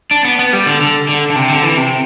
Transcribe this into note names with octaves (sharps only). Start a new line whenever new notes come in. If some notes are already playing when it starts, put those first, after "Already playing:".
D4
B3
B3
G3
D3
D3
D3
D3
C3
D3
E3
C3